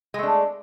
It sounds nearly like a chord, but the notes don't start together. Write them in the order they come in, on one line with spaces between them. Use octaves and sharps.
G#3 A3 D4